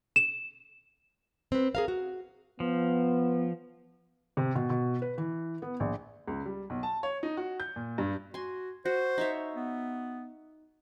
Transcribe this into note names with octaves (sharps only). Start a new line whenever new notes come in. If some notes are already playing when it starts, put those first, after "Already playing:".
E7
C4 B4
G#4 A#4 F5
F#4
F3 B3
C3
B2
B2
B4
E3
B3
A#1
C#2
G3
B1
A5
C#5
D#4
F#4
G6
A#2
G2
F#4 G#5 C6
F#4 C5
D#4 C#5 E5
B3